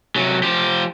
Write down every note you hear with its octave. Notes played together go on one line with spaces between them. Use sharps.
C3 F#3
F3 G4